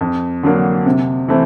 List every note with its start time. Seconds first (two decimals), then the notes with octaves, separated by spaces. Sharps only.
0.01 F2
0.43 D3 F#3 A#3
0.86 C3
1.28 E3 A3 C4